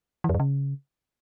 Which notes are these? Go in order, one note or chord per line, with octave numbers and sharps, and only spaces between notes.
E3
F2
F#2
C#3